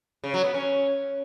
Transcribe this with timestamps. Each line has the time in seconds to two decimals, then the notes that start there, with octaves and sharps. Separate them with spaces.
0.24 C#3
0.34 F#3
0.44 B3
0.54 C#4